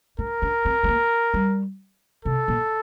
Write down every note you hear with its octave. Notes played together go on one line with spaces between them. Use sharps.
D4 A#4
D4
C4
A3
A#3
G3
C3 A4
A#2